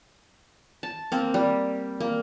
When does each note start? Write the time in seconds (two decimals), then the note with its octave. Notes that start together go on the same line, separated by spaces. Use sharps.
0.83 A5
1.12 A#3 C4
1.34 G3
2.00 A#3